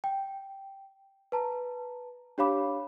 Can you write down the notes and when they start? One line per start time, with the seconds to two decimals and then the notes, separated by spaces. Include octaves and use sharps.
0.04 G5
1.32 B4 A5 A#5
2.38 D4 G4 C#5 F5 B5 D6